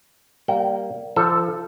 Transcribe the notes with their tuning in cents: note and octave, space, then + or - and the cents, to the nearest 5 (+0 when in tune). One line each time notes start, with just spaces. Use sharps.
G3 -5 A#3 -5 G5 -35
F3 -25 A4 +0